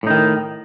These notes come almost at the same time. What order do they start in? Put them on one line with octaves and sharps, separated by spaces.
A2 D#4 D#3